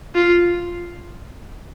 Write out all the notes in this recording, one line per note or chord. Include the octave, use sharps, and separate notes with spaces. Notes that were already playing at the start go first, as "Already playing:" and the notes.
F4